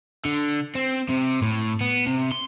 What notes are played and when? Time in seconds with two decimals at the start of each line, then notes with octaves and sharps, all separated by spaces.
0.25 D3
0.75 C4
1.10 C3
1.43 A2
1.81 B3
2.07 C3
2.31 C6